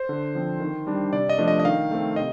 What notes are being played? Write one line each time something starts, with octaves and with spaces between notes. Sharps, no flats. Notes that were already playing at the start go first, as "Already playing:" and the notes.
Already playing: C5
D3
F3 C4
D#3
G3 D4
C3 D5
D#5
F3 A3 D4
D#5
D#5
D#3 F5
A3 C4
C3 D#5